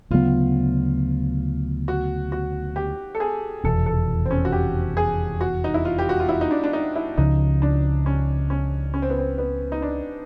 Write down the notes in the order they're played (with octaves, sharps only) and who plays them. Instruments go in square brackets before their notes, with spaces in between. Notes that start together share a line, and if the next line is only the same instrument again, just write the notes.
[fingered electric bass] D2 C#3 F#3 B3 [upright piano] F4
[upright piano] F#4
F#4
G4
A4
G#4
[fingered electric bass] F1 E2 B2 [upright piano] A4
[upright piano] A4
C4
C#4
F#4
G4
G#4
F#4
D#4
E4
F4
G4
F#4
F4
E4
D#4
D4
D4
D#4
E4
[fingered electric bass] C#2 C#3 F3 [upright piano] D#4
[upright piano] D4
C#4
C#4
C#4
C4
B3
C4
B3
D#4
D4